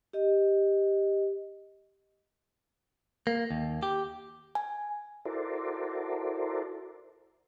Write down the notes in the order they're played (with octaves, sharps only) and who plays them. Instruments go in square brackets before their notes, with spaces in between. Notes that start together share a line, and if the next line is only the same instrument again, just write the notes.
[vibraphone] G4 D#5
[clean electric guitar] A#3
D#2
G4
[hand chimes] G#5
[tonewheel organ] E4 F#4 A4 A#4 C5 D5